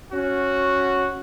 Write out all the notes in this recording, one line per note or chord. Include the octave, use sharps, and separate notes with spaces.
C#4 F#4